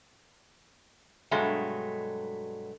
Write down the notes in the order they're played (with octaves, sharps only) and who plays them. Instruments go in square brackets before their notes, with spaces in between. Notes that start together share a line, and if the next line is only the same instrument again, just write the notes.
[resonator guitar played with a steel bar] G2 B2 F#3 G#3 A3